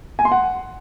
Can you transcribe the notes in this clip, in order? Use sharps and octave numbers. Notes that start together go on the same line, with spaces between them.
G#5
C6
F#5